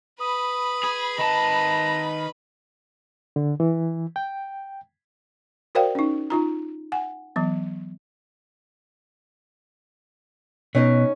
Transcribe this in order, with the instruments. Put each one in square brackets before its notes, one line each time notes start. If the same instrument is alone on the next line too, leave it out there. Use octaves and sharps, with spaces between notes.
[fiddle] B4 B5 [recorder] D#6
[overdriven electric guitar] G#4
[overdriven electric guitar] D#3 A5 [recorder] D#5 [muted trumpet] A#5
[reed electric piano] D3
E3
G5
[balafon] F#4 A#4 C5 D5 F5 G5
C#4 D#4
D#4 F4 A#5
F#5 G#5
E3 F#3 B3
[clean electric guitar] B2 [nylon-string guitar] C#4 D#4 C#5